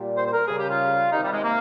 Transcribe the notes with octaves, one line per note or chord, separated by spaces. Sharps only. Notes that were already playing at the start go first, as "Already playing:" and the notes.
Already playing: A#2 G3
C5
C5
A#4
C#3 G3 G#4
G4
F4
C3 D#3 G3 D#4
G3
G#3
A#3